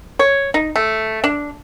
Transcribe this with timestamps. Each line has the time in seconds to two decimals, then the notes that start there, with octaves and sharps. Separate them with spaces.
0.19 C#5
0.54 D#4
0.76 A3
1.24 D4